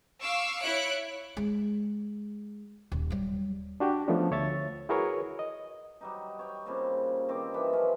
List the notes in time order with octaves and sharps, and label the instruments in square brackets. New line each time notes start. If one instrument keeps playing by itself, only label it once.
[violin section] F5 C#6 D6 E6
E4 C#5 E5 F#6 C#7 D7
[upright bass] G#3
D#1
F#3 G3
[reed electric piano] D4 F#4 G4
F3 A3 B3 C#4 D4
D2 C#5 E5 A6
E4 F#4 G#4 A#4 B4 C#5
D#5
[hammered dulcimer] F#3 G3 D#4
C#5 G5
A#2 C#3 G3 C4
D#3 C4 C5 D6
D#3 E3 D4 B5
F3 C#4 E4